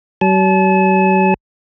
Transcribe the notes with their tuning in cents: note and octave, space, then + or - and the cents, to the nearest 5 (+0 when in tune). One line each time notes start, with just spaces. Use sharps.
F#3 +40 A5 -35